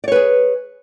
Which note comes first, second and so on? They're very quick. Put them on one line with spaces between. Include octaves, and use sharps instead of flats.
D5 C#5 B4 G#4